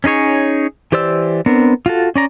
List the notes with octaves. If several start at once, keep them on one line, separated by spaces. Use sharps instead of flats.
C#4 D#4 G#4 C#5
E3 G4 C5 D5 E6
B3 C4 D4 A#4
F4 F#4 A4
C#4 D5 A#5